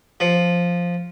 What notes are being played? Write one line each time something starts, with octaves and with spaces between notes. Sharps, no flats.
F3